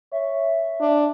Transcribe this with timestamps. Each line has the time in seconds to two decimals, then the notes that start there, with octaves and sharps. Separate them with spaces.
0.12 C#5 E5
0.81 D4